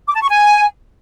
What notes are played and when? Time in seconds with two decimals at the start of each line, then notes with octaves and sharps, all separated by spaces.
0.07 D6
0.15 A5
0.22 C#6
0.30 G#5